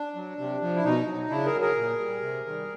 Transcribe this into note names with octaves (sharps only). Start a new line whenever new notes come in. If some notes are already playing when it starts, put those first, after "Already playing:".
Already playing: D4
F#3
C3
F3
E4
B2 D#4
F#3
C#3 D4 E4
G#4 A#4
F#3
G#4 A#4
A#2
G3
C3
D#3 G3